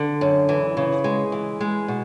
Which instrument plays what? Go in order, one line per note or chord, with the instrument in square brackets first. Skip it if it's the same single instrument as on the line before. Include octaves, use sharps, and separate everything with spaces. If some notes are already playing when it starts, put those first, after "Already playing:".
Already playing: [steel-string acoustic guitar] D3
F#2
E3
C#3
G#3
E3
G#3
B2